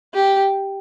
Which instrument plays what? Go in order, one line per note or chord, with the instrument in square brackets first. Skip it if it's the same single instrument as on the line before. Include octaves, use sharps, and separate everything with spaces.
[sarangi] G4